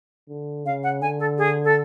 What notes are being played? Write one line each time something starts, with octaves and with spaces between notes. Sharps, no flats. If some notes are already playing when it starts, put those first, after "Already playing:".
D3
C#3 F5
F#5
D3 G#5
A4
G#4
A4